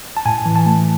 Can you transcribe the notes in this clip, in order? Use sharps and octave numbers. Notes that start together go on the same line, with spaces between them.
A5
A2 G#5
E3
A5
A3